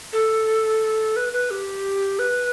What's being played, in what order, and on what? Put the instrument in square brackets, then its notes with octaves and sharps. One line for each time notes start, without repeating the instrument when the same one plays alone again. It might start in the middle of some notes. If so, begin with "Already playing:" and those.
[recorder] A4
B4
B4
G4
B4